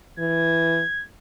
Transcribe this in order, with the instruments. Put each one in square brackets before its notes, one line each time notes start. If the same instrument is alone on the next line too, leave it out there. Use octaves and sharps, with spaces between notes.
[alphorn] E3 [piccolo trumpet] G#6